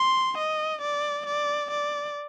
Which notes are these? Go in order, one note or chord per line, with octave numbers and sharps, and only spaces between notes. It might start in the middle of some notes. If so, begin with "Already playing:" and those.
Already playing: C6
D#5
D5
D5
D5